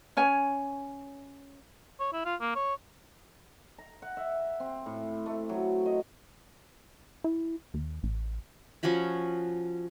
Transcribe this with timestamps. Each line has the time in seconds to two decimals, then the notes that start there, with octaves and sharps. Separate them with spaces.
0.17 C#4 C#5 G#5
2.00 C#5
2.13 E4
2.25 F4
2.41 A#3
2.56 C#5
3.78 A#5
4.02 F#5
4.17 E5
4.60 C4
4.86 A2
5.26 A3
5.49 F#3
5.86 D#5
7.24 E4
7.74 D#2
8.03 A1
8.83 F3 C#4 F#4 B5